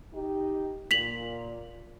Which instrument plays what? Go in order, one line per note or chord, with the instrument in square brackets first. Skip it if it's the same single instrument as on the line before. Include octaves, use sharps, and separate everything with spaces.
[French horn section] D#4 G4
[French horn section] A#2 [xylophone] B6 F7 F#7